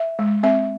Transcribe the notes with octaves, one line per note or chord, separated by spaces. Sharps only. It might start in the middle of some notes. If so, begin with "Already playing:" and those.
Already playing: E5
G#3
C4 E5